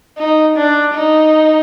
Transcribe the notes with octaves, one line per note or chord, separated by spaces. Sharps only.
D#4
D4
D#4